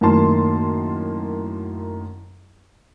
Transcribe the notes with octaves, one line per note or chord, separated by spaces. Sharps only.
F#2 A2 D#3 A#3 A5 C6